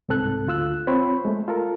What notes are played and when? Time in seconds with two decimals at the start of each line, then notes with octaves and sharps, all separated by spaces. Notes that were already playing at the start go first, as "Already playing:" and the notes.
0.09 C2 G#2 C4 A4 F#6
0.47 D2 F4 E6 F#6
0.87 C4 F4 C5 C#5 B5
1.25 G#3 A3
1.48 F4 A4 A#4